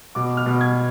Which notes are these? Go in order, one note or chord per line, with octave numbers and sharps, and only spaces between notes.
B2 D6
F6
B2
G#6